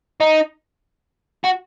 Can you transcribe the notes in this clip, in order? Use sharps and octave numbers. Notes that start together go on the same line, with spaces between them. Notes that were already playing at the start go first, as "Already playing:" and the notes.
D#4
F#4